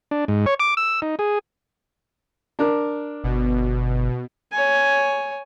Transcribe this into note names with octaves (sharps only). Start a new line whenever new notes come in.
D4
G#2
C#5
D6
E6
D#4
G#4
D4 A#4
G1 B2
C#5 G#5